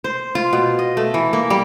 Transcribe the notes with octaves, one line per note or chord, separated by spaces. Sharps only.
C5
F4
B2
D#5
A3
E3
A#3
G3